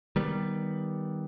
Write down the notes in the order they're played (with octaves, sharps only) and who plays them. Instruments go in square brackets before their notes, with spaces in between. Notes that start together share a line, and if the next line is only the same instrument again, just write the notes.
[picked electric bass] D#3 G3 B3